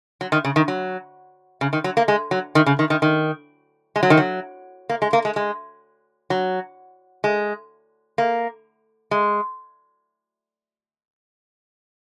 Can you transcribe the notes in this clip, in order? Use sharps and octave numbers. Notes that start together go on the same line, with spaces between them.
F#3
D#3
C#3
D#3
F#3
C#3
D#3
F#3
A#3
G#3
F#3
D#3
C#3
D#3
D#3
D#3
G#3
F#3
D#3
F#3
A#3
G#3
A#3
G#3
G#3
F#3
G#3
A#3
G#3